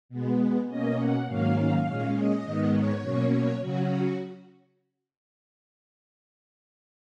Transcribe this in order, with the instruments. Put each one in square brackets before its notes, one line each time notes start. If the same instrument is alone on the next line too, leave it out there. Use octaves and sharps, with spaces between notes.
[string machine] B2 G#3 B3
B2 A#3 C#4 D#5
F#5
G#2 D#3 F#3 A#3 C#4 F5
F5
A#2 G#3 C#4
D#5
G#2 D#3 G#3 B3
C#5
B2 F#3 A#3 C#4
C#5
C#3 F#3 C#4 F#4